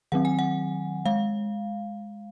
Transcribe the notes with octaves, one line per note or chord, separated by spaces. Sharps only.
D#3 F#3 C4 F#5
G#5
F#5
G#3 F5